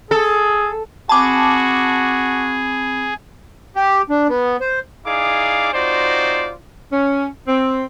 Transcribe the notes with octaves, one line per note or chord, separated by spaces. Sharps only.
G#4 A4
C4 F#4 G#4 G#5 A5 B5 D6
G4
D4
B3
C5
D#4 E4 G#4 D5 F5 D6
C4 D#4 F4 F#4 C5 D5
C#4
C4